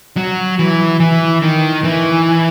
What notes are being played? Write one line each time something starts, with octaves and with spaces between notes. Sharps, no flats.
F#3
E3
E3
D#3
E3